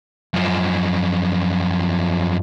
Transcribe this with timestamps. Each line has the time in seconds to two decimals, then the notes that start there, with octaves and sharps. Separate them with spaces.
0.34 F#2 F3